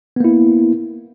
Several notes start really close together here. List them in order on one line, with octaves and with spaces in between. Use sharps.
B3 A#3 E4